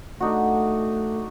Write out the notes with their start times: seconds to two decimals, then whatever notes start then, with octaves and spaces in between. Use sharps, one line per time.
0.20 A3 D4 D#4 F#4